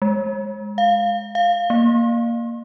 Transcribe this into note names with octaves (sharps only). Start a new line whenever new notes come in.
G#3
F5
F5
A#3